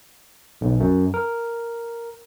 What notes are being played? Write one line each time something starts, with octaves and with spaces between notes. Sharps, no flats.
B1
F#2
A#4